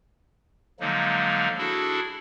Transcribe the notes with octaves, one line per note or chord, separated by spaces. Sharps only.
D3 F3 F#3 G#3 A#3 D#4
D4 E4 F#4 G#4 A4